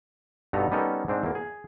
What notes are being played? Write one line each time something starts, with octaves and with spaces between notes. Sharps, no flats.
G2 B2 B3 D#4 A4 A#5
G3 B3 C#4 D#4 A4 A#4
G#2 C4 D4
E2 A#3
G#4